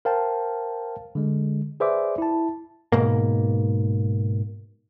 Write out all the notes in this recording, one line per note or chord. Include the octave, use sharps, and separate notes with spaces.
A#4 C5 F5 G5 A5
D3 G#3
G#4 B4 C5 D5 E5 D6
E4 A5
G#2 B2 A#3